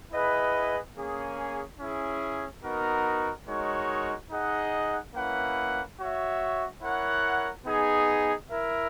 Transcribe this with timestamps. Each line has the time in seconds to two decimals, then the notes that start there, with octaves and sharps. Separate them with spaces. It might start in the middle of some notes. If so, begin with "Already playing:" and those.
0.11 E4 G#4 B4 D#5 F#5
0.95 A#3 C#4 G#4
1.79 C#4 E4 G#4
2.63 B3 D#4 F#4 A#4
3.47 G#3 D#4 F#4 A#4 C#5
4.31 D#4 G#4 D#5 F#5
5.15 A#3 C#4 E4 B4 F#5
5.99 F#4 C#5 E5
6.82 E4 A#4 C#5 F#5
7.66 B3 D#4 G#4
8.50 E4 A#4 E5